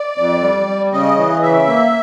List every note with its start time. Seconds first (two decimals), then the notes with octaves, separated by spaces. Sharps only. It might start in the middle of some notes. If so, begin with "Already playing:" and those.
Already playing: D5
0.18 F2
0.42 G3
0.67 G3
0.92 C#3 D#5
1.17 E3
1.42 C#3 E5
1.67 A#3